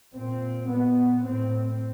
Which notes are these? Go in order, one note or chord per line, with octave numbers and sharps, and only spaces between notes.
A#2 C4
A#2 B3
A2 C4